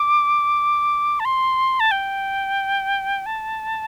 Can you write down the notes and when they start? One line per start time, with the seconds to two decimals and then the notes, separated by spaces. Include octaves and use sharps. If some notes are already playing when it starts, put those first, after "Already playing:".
Already playing: D6
1.20 A5
1.25 C6
1.80 A5
1.91 G5
3.26 A5